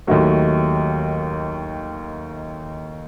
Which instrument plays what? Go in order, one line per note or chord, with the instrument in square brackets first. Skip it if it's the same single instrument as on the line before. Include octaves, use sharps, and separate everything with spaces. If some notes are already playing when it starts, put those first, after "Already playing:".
[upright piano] D#2 D#3 F#3 A3